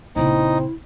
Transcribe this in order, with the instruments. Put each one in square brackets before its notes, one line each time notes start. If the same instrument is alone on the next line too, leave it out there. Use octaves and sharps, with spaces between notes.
[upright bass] A#1 C#3 [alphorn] C4 [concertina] D#4 [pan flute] E4